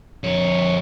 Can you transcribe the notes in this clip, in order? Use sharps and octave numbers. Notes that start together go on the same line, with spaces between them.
F2 C#5